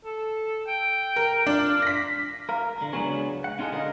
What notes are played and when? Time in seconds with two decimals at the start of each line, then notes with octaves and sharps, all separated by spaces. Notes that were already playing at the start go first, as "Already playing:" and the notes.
0.05 A4
0.67 G5
1.16 A#4
1.47 D4 F4
1.82 A#6 B6
2.49 A#4 F5
2.78 D3 A#4
2.93 C#2 F#3 B3 D4 G#4 C#5
3.44 F#5
3.59 C#4 D#4 F4 F#4 G#4 A4
3.72 D3 A#4 D#5 F5